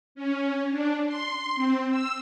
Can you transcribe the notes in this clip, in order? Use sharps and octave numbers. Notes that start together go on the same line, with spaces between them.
C#4
D4
C6
C4
E6